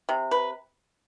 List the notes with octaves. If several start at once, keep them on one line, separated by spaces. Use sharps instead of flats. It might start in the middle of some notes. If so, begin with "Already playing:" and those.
C3
B4